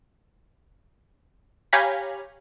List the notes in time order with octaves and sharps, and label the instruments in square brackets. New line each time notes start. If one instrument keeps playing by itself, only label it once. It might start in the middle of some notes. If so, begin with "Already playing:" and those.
[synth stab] G4 C#5 F5 G#5 A#5 B5